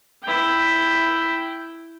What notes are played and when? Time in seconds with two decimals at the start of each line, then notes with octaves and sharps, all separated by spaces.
0.23 E4 G5